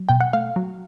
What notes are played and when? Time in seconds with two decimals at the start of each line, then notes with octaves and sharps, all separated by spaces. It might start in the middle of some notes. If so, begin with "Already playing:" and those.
Already playing: F#3
0.09 B2 G5
0.20 F#5
0.33 A3 F5
0.56 F#3